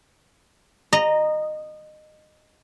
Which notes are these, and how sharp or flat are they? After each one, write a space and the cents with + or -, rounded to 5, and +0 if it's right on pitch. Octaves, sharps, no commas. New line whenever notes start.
D#5 -20 A#5 +0